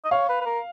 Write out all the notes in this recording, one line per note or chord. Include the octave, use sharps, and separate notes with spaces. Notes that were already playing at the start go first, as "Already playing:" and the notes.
D#5
C#5 F5
B4
B4
A#4